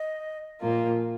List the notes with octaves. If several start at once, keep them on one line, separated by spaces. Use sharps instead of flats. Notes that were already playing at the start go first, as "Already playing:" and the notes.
Already playing: D#5
A#2 F3 A#3 F4